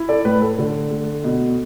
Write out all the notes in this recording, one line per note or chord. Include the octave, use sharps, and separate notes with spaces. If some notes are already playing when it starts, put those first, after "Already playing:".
Already playing: E4
A4 D5
A2 B4
A4
D3
A3
B2